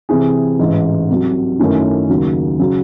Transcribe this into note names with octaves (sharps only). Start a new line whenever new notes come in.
C3 E3 C4 E4 G#4
A1 G#2 E3
C2 C3 F#3
F#2 D#3 A3 C#4 E4
D#2 C#3 F#3
C#3 F#3